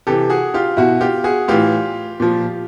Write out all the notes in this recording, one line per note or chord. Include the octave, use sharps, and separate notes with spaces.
C3 E3 G4 A4
F#4 G#4
F4 G4
B2 E4 F#4
F4 G4
F#4 G#4
A2 E3 F4 G4
A#2 F3